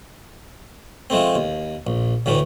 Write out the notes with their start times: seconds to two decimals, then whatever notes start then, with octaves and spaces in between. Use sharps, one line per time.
1.10 F3 G#3 A3 C4
1.35 D#2
1.87 A#1
2.26 D2 A2 E3 A3